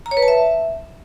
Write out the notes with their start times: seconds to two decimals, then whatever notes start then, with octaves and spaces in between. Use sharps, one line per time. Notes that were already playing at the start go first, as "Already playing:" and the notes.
0.06 A#5
0.11 C#5
0.17 B4
0.22 A5
0.28 E5